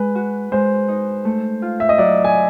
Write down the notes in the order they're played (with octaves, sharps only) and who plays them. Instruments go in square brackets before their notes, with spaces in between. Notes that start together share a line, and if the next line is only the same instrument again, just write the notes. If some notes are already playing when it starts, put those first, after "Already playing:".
Already playing: [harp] G#3 [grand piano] B4
[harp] F#4
[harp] G#3 [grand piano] C5
[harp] D#4
A3
F4
[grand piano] E5
D#5
[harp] F#3 [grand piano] D5
[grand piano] G#5